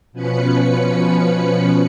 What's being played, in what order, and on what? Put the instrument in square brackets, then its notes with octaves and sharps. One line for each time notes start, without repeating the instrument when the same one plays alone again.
[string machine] B2 F3 C#4 B4 B5 C#7